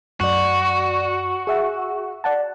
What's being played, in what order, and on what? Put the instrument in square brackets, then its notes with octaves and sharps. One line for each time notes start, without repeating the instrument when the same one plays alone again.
[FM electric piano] F#2 D5 [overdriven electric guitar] F#4
[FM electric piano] G#4 E5 F#5
D5 F#5 A5